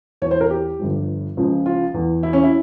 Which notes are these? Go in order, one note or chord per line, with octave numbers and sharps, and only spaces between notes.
E2 E3 C#5
C5
A#4
G4
G1 G2 F3
C#2 C#3 F3
F4
E2 E3
E4
C#4
E4